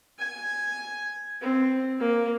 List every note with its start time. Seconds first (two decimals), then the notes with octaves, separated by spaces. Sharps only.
0.19 G#5
1.42 C4
2.00 A#3